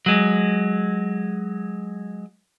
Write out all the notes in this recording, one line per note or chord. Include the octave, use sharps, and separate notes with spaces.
F#3 G#3